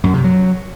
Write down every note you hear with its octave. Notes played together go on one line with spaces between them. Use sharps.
F#2
C3
F#3